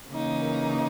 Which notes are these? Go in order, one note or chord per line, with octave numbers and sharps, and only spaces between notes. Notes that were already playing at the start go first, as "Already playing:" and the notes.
C#3 E3 A#3 D#4
A#4